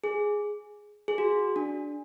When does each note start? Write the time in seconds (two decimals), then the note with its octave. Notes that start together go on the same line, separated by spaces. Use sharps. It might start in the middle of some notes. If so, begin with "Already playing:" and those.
0.04 G#4
1.08 G#4
1.18 F#4
1.56 D4